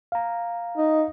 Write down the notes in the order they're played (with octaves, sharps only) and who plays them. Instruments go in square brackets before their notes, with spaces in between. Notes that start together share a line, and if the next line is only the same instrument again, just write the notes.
[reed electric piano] F5 A#5
[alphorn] D#4